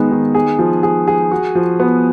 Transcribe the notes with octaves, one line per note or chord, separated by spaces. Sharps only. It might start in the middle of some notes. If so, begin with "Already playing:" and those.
Already playing: D#3 G#3 B3
D#3
G#4
F3
G#4
G#4
F#4
F3
B3